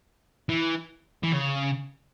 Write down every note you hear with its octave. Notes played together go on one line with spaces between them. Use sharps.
E3
E3
C#3